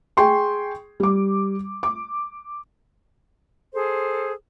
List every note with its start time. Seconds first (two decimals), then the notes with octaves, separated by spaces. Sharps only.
0.17 G#4 G5 C6 C#6
1.00 G3 D6
1.83 D6
3.73 G#4 A4 C5